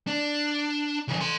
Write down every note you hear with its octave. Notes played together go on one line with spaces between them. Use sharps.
D4
C#3 E3
A4 C6